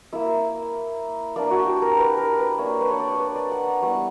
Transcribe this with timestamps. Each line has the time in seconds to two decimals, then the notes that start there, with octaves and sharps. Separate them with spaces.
0.13 A#3 E4 E5
1.36 A#3 D4 D5
1.51 F#4
1.66 G4
1.82 A#4
1.97 B4
2.17 A#4
2.38 B4
2.58 A#3 D4 C#5
2.81 B4
2.91 C#5
3.00 D5
3.20 B4
3.36 D5
3.52 F#5
3.67 A#5
3.82 G3 B3 E4 C#6